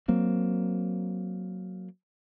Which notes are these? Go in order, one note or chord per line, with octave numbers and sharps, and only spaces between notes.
F#3 A#3 C4